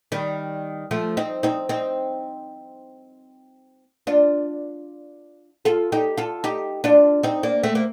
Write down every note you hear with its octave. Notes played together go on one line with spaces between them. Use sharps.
D#3 G3
F3 A3
C4 D#4
C4 D#4
C4 D#4
D4 F4
F4 A4
D#4 G4
F4 A4
D#4 G4
D4 F4
C4 D#4
A#3 D4
A3 C4
A#3